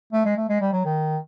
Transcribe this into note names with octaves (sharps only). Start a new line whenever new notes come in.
A3
G#3
A3
G#3
G3
F#3
D#3